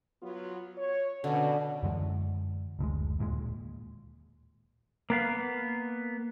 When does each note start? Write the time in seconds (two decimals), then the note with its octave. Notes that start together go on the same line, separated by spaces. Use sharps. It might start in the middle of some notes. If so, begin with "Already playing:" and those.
0.23 F#3 B3 F4
0.78 C#5
1.24 B2 D3 C#4
1.83 F#2 D3 E3 G#3
2.79 F#1 D2 C3 G#3
3.19 D1 D#2 A#2 G#3
5.10 A#3 B3 F5